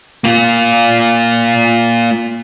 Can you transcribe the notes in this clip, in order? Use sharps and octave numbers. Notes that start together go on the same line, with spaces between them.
A#3 F4